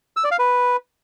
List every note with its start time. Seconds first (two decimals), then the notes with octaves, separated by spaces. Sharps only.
0.16 E6
0.24 D5
0.31 F5
0.39 B4